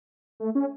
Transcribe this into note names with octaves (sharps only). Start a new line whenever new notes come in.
A3
C#4